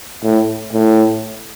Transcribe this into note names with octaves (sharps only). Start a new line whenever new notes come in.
A2
A2